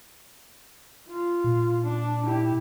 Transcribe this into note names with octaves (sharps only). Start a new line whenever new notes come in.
F4
A#2
D4
E4 G4